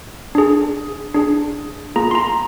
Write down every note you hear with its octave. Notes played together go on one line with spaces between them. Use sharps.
D4 G#4
D4 G#4
A#3 F4 G#4 A#5
C6
A#5